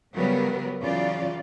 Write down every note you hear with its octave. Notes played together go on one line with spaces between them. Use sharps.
C#3 F#3 G3 B3 A#4 B4
C#3 E3 F#3 F4 D5